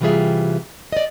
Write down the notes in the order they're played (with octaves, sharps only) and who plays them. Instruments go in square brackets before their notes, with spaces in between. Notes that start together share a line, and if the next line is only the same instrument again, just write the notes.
[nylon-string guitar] C3 E3 G3 F4 G#4 E5
D5 D#5